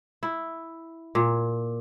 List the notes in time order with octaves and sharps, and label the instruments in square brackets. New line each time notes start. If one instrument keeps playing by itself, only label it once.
[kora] E4
A#2